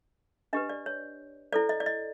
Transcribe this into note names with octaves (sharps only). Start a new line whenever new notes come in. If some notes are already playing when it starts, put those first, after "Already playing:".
D4 G4 B4 D#5
D5
C#5
E4 A4 C5 D5
D#5
D5
D#5